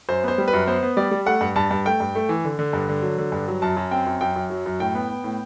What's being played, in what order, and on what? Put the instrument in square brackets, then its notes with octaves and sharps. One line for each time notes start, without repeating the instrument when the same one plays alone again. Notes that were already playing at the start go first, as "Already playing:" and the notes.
[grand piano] F#2 C5
B3 C5
G3
B4
F#2
B3 C5
B3
G3 D5
G3
A3 F#5
G2
G2 A5
G2
A3 G5
G2
A3
E3
D3
D3
G2
D3
F#3
D3
G2
F#3
F#2 A5
F#2
C4 G5
F#2
F#2 G5
F#2
F#3
F#2
A2 G5
B3
B3
A2